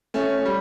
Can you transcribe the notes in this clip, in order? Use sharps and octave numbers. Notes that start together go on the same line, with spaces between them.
A3 C#4
C#4
G3